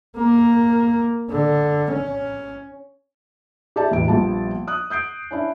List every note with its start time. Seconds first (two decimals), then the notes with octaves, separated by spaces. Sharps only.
0.17 A#3
1.30 D3
1.92 C#4
3.76 G4 D5 E5 A5
3.91 E1 A1 E3 D7
4.08 A#1 F3 G3 B3 A5
4.67 D#6 F#6
4.90 D#6 G6 C7 D7
5.31 C#4 D4 E4